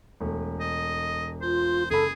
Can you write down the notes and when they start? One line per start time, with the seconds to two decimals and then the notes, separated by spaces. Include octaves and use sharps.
0.21 E1 A3
0.60 D#5
1.42 F4 C5
1.90 F#1 G#4 A4 B5